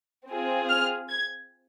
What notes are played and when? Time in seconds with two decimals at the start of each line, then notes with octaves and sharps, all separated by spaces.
0.28 C4 F4 G#4
0.69 F6
1.09 G#6